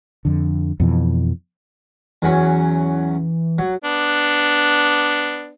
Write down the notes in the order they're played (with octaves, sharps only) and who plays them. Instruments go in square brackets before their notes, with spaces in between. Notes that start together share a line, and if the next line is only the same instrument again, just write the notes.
[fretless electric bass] F2 D3
F2 B2 E3
[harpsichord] E2 F#3 C#4 [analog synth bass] E3
[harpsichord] F#3
[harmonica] B3 D4